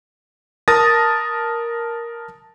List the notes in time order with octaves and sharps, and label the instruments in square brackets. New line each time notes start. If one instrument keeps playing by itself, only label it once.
[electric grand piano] A#4 A5 D#6 A6 A#6